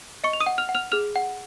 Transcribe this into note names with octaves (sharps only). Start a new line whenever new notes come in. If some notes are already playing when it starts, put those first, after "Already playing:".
D#5 C#6 C#7
F7
D#6 D#7
F#5
F6 F7
F#5
F6 F7
G#4 F6 F7
F#5